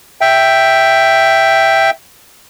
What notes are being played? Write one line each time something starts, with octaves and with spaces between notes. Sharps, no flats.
E5 G5